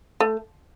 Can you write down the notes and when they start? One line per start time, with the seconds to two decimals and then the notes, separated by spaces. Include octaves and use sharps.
0.20 A3